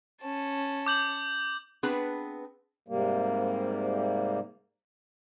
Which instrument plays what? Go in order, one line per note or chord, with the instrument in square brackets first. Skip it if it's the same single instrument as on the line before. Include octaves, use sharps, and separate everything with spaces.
[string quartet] C#4 A5
[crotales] D6 G6 F#7
[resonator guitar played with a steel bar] B3 C4 D4 G#4 B4
[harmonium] G#2 C3 G3 A#3